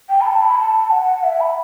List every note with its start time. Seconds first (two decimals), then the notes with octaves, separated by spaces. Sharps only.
0.09 G5
0.21 B5
0.26 A5
0.42 B5
0.59 A5
0.91 F#5
1.24 E5
1.40 B5